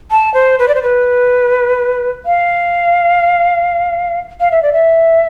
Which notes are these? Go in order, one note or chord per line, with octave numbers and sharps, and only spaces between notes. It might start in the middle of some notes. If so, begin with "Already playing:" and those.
A5
C5
B4
D5
C5
B4
F5
F5
E5
D5
E5